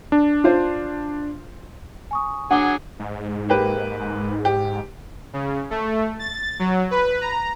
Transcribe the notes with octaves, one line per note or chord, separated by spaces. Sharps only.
D4
F4 C5
G#5 C#6 D#6
F#3 D4 G#4 F#5 G#5 D6 G7
G#2
A#3 G4 B4
G4
C#3
A3
A6
F#3
B4
A#5